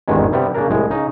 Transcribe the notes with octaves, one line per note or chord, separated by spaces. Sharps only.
G#1 E2 G2 D3 D#3 G#3
G2 C3 G3 B3 G4
C#3 A#3 D4 A#4
C2 A2 G#3
C#3 D#4